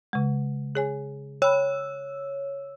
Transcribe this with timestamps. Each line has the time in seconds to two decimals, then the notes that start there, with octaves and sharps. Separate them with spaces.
0.13 C#3 G#3
0.75 G#4 C#5 G#5
1.42 C#5 G5 B5 E6